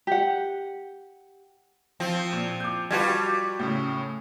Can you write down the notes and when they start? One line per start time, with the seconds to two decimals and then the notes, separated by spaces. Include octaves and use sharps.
0.07 G4 F#5
2.00 F3 C4
2.33 A#2
2.60 D6 G6
2.91 G3 F4 F#4 B4 A5 G#6
3.59 A2 C#3 A3